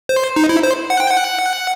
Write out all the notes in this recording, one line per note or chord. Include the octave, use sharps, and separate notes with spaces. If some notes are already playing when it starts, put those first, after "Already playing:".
C5
D#4
E4
C5
F#5
G5
F#5